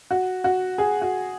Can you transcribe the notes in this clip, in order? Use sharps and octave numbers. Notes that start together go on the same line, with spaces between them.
F#4
F#4
G#4
F#4